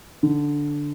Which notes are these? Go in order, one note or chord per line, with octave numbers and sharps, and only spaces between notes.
D3